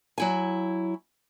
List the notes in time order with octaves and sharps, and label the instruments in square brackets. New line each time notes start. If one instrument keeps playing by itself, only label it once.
[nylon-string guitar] F#3 E4 G#5